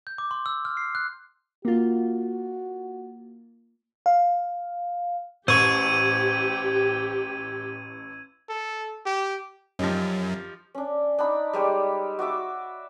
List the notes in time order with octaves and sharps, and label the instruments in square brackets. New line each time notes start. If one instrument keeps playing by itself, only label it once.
[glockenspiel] G6
D6
C6
E6
F6
C7
F#6
[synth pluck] A#3 F4 [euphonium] F#4
[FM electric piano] F5
[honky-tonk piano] A1 [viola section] G4 [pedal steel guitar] C5 C#6 [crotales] E6 G#6 D#7
[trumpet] A4
G4
[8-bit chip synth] F#2 [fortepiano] F3 G3 D#4
[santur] C#4 D4
D4 D#4 B5
G3 G#3 G4 C#5
F#4 D5 E5 D6